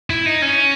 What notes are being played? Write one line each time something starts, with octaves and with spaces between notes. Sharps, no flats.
E4
D#4
C#4